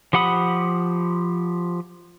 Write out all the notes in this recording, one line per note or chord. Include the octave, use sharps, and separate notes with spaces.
F3 G4 F#5 B5 D#6